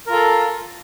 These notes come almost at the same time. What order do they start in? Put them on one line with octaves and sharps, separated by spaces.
A#4 F4 A4